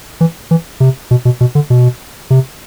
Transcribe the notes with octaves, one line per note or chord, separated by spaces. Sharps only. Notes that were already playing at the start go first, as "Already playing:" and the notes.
E3
E3
C3
B2
B2
B2
D3
B2
C3